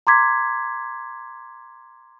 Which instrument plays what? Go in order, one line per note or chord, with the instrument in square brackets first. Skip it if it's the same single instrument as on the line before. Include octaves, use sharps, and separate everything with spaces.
[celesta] A#5 C6 D6 G#6 B6